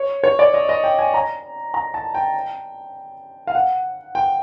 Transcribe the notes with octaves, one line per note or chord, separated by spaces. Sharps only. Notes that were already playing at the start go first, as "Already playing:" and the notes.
Already playing: C#5
C#5
D5
D#5
D#5
G5
G#5
A#5
A#5
A5
G5
F5
F#5
G5